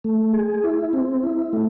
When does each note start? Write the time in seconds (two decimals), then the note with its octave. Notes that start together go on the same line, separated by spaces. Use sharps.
0.04 A3
0.33 G#4
0.64 E4
0.93 C4
1.23 E4
1.53 A3